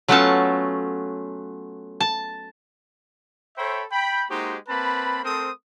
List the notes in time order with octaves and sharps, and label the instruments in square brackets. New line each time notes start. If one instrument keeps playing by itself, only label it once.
[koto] F#3 A3 B3 C#4 F4 A5
A5
[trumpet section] A4 C5 C#5 E5 G5 B5
G5 B5
G#3 A#3 D#4 F#4 G4 C5
A#3 C4 B4 A5 B5
A3 C4 A4 A#4 C5 D#6